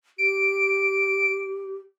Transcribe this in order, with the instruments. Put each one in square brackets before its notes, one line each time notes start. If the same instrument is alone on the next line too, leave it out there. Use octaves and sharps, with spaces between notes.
[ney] G4 [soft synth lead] D7